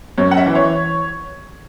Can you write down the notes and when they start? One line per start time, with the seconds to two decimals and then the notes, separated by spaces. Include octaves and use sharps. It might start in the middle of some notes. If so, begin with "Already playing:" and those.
0.17 F#2 C#5
0.31 F#5
0.37 E5
0.46 E3
0.55 C#5